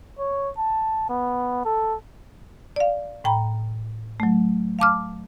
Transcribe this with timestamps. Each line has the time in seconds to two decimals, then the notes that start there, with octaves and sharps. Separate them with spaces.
0.19 C#5
0.58 A5
1.09 B3
1.65 A4
2.76 D5 F5
3.24 A2 G5 A#5 B5
4.20 F#3 A3
4.79 F5 A5 D6 F6